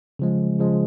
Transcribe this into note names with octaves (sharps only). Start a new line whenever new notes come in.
C#3 F3 G#3
C#3 F3 G#3